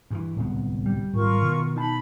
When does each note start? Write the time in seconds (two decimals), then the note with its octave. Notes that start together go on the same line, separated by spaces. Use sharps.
0.11 G2 D#3 E3
0.36 D1 C2 B3
0.86 G3
1.13 G#1 F4 A#4 C#6
1.42 B2 D#3
1.76 D#4 A5 B5